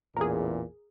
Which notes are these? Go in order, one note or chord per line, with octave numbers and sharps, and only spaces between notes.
A1 E2 A#2 G#4 A#4